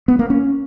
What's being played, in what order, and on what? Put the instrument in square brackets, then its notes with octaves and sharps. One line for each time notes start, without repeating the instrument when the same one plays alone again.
[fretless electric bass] B3
A#3
C#4